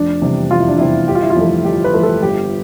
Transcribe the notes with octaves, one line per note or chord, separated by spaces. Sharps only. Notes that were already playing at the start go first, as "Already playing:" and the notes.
Already playing: F1 D4
E2 C3 G3
F1 F4
E4
D4
E2 C3 G3 E4
G1 G4
F4
E4
F4
F2 E3 A3
G1 G4
B4
F2 E3 A3
A4
G1 G4